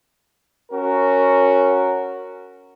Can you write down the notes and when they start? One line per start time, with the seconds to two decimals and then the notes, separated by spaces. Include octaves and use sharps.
0.72 C#4 F#4 A#4